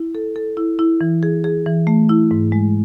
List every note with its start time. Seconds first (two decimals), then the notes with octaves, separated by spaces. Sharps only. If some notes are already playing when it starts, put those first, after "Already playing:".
Already playing: E4
0.15 A4
0.36 A4
0.57 E4
0.79 E4
1.01 E3
1.23 G#4
1.44 G#4
1.66 E3
1.87 A3
2.09 E4
2.31 G#2
2.52 G#3